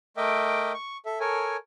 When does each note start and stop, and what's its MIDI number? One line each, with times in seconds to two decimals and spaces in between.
0.17 0.73 57
0.17 0.73 70
0.17 0.73 75
0.17 0.73 76
0.17 0.73 79
0.17 0.73 86
0.74 0.97 85
1.06 1.19 69
1.06 1.19 76
1.20 1.57 69
1.20 1.57 70
1.20 1.57 73
1.20 1.57 80